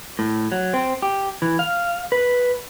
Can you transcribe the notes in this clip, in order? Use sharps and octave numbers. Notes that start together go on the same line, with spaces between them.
A2
F#3
C4
G4
E3
F5
B4